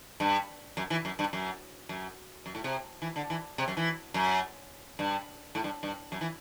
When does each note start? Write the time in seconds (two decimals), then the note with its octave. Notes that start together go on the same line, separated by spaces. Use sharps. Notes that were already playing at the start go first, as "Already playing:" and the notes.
0.20 G2
0.77 F#2
0.90 E3
1.05 F#2
1.19 G2
1.33 F#2
1.89 F#2
2.46 F#2
2.55 A2
2.64 C3
3.02 E3
3.16 D3
3.30 E3
3.58 C3
3.68 F#2
3.77 E3
4.14 F#2
4.99 G2
5.55 A2
5.64 G2
5.83 G2
6.12 F#2
6.21 E3